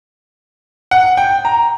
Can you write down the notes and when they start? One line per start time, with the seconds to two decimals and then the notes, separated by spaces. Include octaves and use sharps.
0.91 F#5
1.17 G5
1.45 A#5